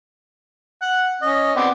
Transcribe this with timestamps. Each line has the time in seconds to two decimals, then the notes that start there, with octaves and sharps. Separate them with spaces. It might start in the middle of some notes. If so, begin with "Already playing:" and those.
0.82 F#5
1.22 C#4 D#5
1.56 B3 C4 D5